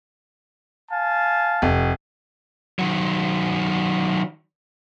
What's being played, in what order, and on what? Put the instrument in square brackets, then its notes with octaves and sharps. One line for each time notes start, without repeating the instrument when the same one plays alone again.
[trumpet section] F5 G#5 A5
[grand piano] F1
[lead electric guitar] D#3 F#3